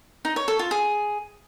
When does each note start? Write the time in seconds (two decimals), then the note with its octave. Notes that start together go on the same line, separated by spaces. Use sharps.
0.25 D#4
0.36 C#5
0.48 A4
0.59 F4
0.71 G#4